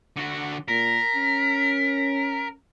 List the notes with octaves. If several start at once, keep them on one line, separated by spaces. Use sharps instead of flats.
D3 F#4
A#2 A#4 B6
C#4